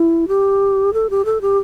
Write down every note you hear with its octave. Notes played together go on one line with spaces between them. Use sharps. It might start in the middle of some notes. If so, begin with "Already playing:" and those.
Already playing: E4
G4
A4
G4
A4
G4